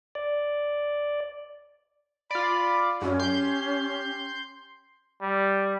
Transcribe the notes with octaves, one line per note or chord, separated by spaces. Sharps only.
D5
F4 D5 B5
F#2 C#4
G4 C6 G6
G3